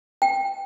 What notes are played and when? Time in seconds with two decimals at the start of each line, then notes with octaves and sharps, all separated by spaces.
0.22 G5